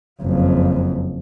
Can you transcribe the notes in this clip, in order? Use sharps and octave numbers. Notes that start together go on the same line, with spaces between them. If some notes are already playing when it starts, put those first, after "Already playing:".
F#1 F2